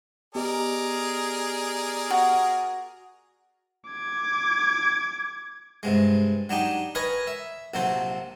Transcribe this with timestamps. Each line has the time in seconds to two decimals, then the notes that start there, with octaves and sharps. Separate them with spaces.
0.35 B3 G4 G#4 A#4 D5 D#5
2.10 F#4
3.88 D6 G#6
5.83 G2 C3 G#3
6.49 F#3 D4 D#4 G4
6.95 A#4 B4 C#5 D#5 G#5
7.27 E5
7.74 A#1 C3 F#3 A4 C5